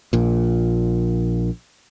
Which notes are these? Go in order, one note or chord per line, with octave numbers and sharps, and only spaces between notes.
A#1 A#2